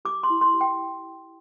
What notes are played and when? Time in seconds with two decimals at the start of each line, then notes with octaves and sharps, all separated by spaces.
0.05 G4 D6
0.23 C6
0.30 E4
0.41 C6
0.54 G4
0.61 G5